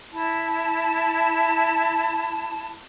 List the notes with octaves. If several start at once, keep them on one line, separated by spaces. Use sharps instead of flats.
E4 A5